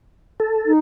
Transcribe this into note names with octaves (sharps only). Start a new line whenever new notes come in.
A4
D#4